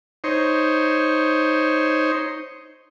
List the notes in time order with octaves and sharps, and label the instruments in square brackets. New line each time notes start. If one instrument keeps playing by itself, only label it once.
[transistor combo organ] D#4 C5 C#5